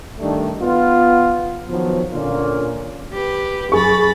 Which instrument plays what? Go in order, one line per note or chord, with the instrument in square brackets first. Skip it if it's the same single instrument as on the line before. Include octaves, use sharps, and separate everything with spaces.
[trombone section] D#3 G3 A3 D4
B3 F4
D#3 F3 F#3 B3
A#2 D3 A#3 C#4 F4
[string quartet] G4 B4
[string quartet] F#2 B5 A6 [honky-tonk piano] G#4 C#6